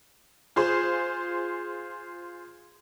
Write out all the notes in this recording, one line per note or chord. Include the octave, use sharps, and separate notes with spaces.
F4 G#4 C5 C6